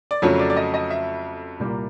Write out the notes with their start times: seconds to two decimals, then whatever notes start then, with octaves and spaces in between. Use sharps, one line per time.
0.11 D5
0.22 F2 C#3 F#3 A3 C#5
0.39 D5
0.50 D5
0.56 D#5
0.74 D#5
0.90 E5
1.59 C2 A#2 G3 A#3